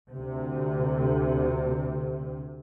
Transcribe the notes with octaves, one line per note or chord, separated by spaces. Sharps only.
D2 C3